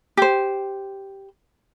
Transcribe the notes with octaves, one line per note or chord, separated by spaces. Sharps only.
G4 C5